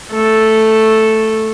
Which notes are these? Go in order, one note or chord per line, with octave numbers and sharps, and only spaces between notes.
A3 A4